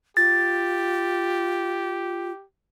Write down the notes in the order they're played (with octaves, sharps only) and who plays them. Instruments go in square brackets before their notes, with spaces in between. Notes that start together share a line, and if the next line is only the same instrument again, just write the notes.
[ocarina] F4 [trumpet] G4 [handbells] A6